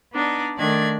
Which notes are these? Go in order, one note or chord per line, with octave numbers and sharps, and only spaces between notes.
B3 D4 D#4 D5
D#3 A3 D4 D5 G#6